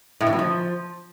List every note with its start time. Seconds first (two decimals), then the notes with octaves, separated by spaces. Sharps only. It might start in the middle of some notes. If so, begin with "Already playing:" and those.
0.21 A2
0.27 E3
0.33 F#3
0.39 F3